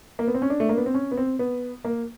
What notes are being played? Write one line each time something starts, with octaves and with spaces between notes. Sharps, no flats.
A#3
B3
C4
C#4
D4
A3
A#3
B3
C4
C#4
B3
C4
B3
A#3